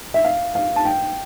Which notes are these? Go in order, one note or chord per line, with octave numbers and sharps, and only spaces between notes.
E5
F5
F5
A5
G5